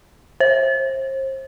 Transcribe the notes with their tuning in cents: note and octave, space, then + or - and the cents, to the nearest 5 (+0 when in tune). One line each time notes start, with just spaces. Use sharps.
C5 +35